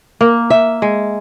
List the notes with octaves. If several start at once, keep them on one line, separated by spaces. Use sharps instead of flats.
A#3
E5
G#3